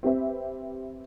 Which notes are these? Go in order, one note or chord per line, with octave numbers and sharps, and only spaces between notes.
C4 G4 B4 E5